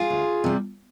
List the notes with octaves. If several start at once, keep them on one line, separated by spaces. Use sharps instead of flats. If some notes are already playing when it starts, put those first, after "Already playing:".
Already playing: F4 G#4
D2
C3 G3